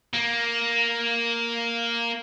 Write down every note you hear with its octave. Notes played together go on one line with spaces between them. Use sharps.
A#3